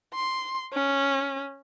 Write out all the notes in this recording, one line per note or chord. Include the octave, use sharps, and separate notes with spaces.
C6
C#4